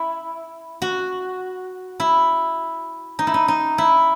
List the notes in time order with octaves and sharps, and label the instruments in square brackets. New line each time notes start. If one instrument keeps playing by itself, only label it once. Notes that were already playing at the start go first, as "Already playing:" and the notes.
Already playing: [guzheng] E4
F#4
E4
D#4
E4
D#4
D#4
E4